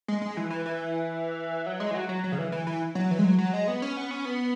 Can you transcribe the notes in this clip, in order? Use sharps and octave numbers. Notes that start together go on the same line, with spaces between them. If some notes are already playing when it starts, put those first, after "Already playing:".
G#3
G#3
E3
E3
E3
F#3
G#3
E3
F#3
F#3
F#3
C#3
E3
E3
E3
F#3
E3
G#3
F#3
F#3
G#3
B3
C#4
B3
C#4
B3